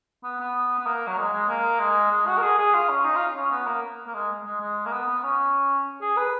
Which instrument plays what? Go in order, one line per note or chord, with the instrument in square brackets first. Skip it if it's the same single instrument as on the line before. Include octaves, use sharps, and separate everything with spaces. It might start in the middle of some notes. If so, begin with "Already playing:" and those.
[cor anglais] B3
B3
B3
A#3
F#3
G#3
G#3
A#3
G#3
G#3
F#4
A#4
G#4
G#4
F4
C#4
D#4
F4
C#4
B3
A#3
A#3
G#3
G#3
G#3
A#3
B3
B3
C#4
G#4
B4